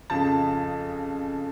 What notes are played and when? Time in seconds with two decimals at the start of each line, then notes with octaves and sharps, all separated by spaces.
0.10 F2 C#3 F3 A5